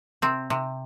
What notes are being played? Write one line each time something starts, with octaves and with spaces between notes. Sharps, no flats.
C3 C4
C3